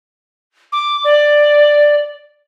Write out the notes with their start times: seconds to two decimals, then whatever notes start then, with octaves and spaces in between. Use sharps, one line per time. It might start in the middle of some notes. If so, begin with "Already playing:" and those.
0.72 D6
1.04 D5